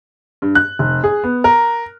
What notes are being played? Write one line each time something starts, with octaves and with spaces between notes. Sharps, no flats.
G2
F#6
F1
G#4
B3
A#4